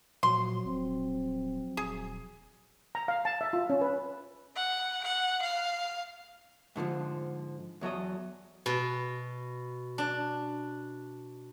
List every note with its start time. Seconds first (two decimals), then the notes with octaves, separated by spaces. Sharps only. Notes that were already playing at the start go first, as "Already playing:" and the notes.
0.23 A#2 F3 F#3 F#4 C6
0.65 D#1 C4
1.77 D#1 G#4
2.95 A#5
3.08 F5
3.25 A5
3.41 E5
3.53 F4
3.70 C#4
3.81 B4
4.56 F#5
5.04 F#5
5.41 F5
6.76 G#2 D3 D#3 F3
7.81 E2 F#3 A4 D#5
8.66 B2
9.98 D4